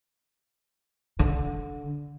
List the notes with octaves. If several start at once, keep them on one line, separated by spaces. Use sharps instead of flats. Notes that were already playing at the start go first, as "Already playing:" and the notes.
D3